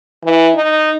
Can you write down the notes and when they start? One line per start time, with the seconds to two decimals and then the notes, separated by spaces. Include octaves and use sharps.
0.24 E3
0.55 D#4